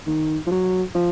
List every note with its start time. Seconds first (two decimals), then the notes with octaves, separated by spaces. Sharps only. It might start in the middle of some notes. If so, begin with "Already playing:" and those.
0.07 D#3
0.47 F3
0.51 F#3
0.95 F3